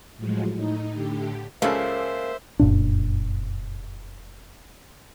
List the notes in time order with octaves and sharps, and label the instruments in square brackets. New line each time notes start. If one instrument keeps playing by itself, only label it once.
[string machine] A2 F3 F#3 G#3
A2 D#4
A2 D3 G4
[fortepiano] C#2 C#3 A4 [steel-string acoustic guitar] A#3 [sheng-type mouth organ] C5 E5
[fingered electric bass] F1 F#2 A#2 D4